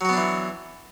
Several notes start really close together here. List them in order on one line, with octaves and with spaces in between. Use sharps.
F#3 F#4 B3 D4 E3